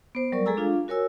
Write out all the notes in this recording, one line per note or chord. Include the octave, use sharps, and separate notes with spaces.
B3 C5
F#3 G3 A#4 D5 C#6
G#3 G#4 A4 G#5 A#5 E6
D4 F4 F5
F#4 A#4 C#5 G#5 E6